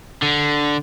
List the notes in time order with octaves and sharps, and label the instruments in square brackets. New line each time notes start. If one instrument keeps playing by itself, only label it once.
[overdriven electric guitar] D3